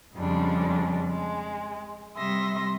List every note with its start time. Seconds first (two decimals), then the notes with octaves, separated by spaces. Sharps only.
0.15 F2 C#3 F3 G3 G#3 D4
1.08 G#3
2.17 C3 G3 E5 C6 D#6 A#6